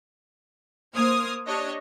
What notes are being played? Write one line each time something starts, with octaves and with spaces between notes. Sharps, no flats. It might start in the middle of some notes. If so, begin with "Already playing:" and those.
A#3 C5 D#6 F6 G#6
D4 G4 C#5 D#5